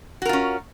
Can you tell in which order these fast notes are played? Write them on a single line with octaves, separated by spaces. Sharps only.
F#4 A#4 F4 C#4